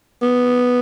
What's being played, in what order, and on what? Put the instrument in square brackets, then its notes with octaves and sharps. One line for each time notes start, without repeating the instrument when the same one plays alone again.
[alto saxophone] B3